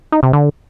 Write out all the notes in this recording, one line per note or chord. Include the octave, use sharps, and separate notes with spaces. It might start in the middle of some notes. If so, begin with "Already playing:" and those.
D#4
C3
D3